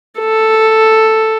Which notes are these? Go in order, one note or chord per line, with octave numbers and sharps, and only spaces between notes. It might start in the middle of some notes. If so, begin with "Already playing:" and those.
A4